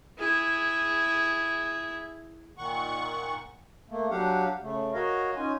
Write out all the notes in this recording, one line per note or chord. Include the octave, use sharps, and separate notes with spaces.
E4 G#4
A#2 D#3 F#5 C#6
A3 A#3
F#3 D4 G4 F5 F#5
C#3 A3
F#4 A#4 C#5 D#5 F5
C#4 D#4 F4 G#5